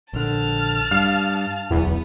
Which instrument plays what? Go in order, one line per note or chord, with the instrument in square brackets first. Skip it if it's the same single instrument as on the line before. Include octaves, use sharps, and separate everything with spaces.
[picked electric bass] A#1 D3 [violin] A5 F6
[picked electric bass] G2 [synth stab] F5
[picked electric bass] D1 B1 [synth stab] E2 [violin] B3